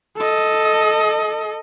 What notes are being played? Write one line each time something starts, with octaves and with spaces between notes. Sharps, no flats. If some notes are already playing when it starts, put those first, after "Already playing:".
A4 D#5